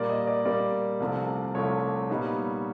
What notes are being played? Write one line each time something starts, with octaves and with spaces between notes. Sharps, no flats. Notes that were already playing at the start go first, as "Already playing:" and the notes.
Already playing: A#2 G3 A#3 D5
D#5
D5
A#2 G3 A#3 D5
C2 C3 F3 A3
C2 C3 F3 A3 C#5
A#2 G3 B3 D#4